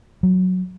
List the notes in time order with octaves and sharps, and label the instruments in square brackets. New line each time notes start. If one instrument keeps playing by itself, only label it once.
[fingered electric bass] F#3